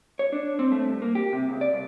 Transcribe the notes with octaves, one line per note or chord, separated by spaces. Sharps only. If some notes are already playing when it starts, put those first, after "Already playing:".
C#5
D4
C4
A3
G2
A#3
G4
C3
C#2
D5
C2